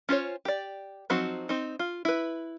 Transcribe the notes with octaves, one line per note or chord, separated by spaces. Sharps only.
C#4 F4 C5 C#5
G4 D5
F3 F#3 C4 D#4 F#4
C4 D#4
F4
E4 B4